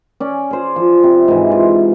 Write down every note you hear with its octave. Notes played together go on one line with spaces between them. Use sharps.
C#4 D5
G#4 C5
F3
C3
G#2 E3
F4